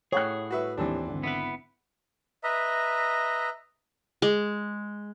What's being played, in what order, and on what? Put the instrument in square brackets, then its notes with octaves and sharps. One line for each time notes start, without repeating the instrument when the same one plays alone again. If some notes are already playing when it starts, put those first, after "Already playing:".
[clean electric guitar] A2 G#4 [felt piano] A4 F#5 F#6 [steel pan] C#5 G5
[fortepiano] F#4 B4 E5
[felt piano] D#2 G4 A5 [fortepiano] E3 C4 D4
[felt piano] G#1 D3
[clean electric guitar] B3 E4 B4
[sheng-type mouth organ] B4 D#5 E5 A#5
[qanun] G#3